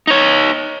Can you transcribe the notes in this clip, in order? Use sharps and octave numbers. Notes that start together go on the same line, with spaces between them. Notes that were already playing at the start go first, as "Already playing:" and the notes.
D#4 C#5